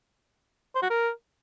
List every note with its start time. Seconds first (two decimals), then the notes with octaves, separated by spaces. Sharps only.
0.75 C5
0.82 F#4
0.90 A#4